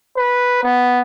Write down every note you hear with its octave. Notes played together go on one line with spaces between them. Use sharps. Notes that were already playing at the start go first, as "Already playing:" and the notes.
B4
B3